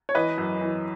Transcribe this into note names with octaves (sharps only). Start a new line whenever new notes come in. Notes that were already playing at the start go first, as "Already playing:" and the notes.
C#5
E3 B4 D#5
F#2
E3